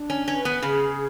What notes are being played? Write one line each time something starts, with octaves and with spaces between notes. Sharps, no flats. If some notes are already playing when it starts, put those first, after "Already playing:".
Already playing: D4
C#4
C#4 B4
B3
C#3 G#4